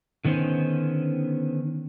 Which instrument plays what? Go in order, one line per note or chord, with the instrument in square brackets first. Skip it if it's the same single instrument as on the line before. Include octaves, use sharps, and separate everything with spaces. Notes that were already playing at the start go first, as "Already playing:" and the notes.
[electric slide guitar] D3 D#3 B3 C#4 C5